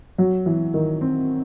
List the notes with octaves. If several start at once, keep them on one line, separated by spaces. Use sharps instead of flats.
F#3
E3
D#3
C4